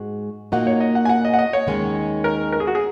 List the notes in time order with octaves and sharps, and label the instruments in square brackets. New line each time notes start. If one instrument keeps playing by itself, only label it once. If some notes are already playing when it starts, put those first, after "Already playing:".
Already playing: [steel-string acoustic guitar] G#2 G#3 F#4
[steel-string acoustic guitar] A#2 A#3 D#4 F#4 [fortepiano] F#5
[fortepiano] C#5
D#5
F#5
G#5
F#5
D#5
F#5
D#5
C#5
[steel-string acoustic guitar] D#2 D#3 G#3 C#4
[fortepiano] A#4
A#4
G#4
F#4
G#4